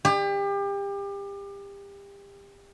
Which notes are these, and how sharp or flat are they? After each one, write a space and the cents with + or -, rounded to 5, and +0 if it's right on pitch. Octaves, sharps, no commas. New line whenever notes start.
G4 +30